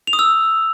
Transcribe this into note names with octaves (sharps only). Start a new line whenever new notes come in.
F7
D#6
E6